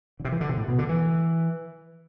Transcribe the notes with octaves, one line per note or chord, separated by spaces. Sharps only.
D3
C3
E3
D3
C3
A2
B2
D3
E3